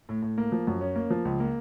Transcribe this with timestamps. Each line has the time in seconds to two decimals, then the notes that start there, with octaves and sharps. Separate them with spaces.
0.09 A2
0.22 A2
0.38 A#3
0.52 F3
0.67 F#2
0.81 C#4
0.95 A#3
1.10 F3
1.25 C#2
1.40 A#3